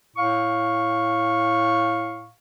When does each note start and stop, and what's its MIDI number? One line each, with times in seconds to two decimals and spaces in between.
0.17 2.30 45
0.17 2.30 77
0.17 2.30 85